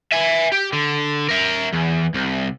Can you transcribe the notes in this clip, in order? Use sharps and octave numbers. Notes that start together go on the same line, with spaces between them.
E5 G#5
G4
D3
A#4 E5
E2
C2